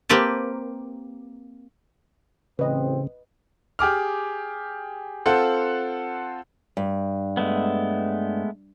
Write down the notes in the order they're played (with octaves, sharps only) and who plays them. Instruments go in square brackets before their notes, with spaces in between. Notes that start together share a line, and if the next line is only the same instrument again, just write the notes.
[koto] A#3 C4 G4 B4 A5
[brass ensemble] A1 C4 [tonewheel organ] C#3 [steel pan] B4 D#5
[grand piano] G4 G#4 D6 F6
C4 F4 A4 C5 F#5
[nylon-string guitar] G2
[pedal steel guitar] G#3 A3 B3